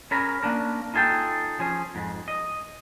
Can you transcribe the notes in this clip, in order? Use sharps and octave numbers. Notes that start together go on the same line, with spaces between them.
C#4 G#4 A#4 A#5 B5
A#3 C#4 D4 A#4
D#4 F4 G#4 A4 G5
F3 C#4 G#4
F2 G#2
D#5